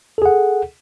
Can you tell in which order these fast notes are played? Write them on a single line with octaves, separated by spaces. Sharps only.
A4 G#4 F#5